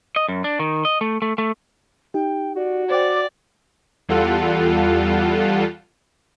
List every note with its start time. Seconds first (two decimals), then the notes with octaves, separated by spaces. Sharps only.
0.16 D#5
0.28 F#2
0.44 D4
0.59 D#3
0.85 D#5
1.01 A3
1.22 A3
1.38 A3
2.14 D#4 G4 G5
2.56 F#4 D5
2.91 C5 D5 F#5 G5 D6
4.09 E2 G3 F4 A4 F#5